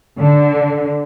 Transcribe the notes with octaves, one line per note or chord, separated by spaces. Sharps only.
D3